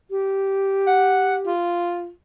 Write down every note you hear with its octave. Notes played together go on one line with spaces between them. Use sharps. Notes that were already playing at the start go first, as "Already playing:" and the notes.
G4
F#5
F4